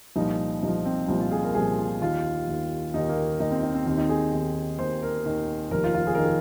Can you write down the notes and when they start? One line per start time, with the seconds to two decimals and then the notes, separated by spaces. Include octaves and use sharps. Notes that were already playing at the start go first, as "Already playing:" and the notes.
0.16 C2 A#2 F3 D#4
0.63 C2 A#2 F3 D#4
0.85 C4
1.08 C2 A#2 F3 C4
1.20 F4
1.32 G#4
1.44 A#4
1.55 C2 A#2 F3 G#4
1.78 F4
2.01 D#2 D#3 F4
2.48 D#2 D#3
2.94 D#2 D#3 D#4
3.09 A#3
3.40 D#2 D#3 D#4
3.51 C4
3.63 D#4
3.74 C4
3.87 D#2 D#3 C4
3.98 D#4
4.09 G#4
4.33 D#2 D#3
4.79 D#2 D#3 C5
5.03 A#4
5.26 D#2 D#3
5.71 F1 D#2 D#3 A#4
5.84 F4
5.94 F4
6.07 G#4
6.15 D#3 A#4
6.25 G#4